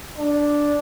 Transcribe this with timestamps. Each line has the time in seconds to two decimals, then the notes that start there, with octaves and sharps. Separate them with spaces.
0.18 D4